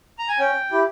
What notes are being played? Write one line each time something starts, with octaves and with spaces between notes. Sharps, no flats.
A#5
G#5
C#4 G5
E4 G4